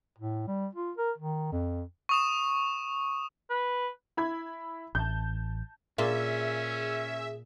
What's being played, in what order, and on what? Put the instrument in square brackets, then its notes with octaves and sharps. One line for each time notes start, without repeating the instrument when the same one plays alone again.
[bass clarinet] A2
G3
F4
A#4
D#3
F2
[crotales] C#6 D#6 E7
[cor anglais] B4
[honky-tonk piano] E4 B5 G#6
[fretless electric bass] A1 [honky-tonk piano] A5 G6
[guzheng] A#2 F4 [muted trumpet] C#4 [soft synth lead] G#4 [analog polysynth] E5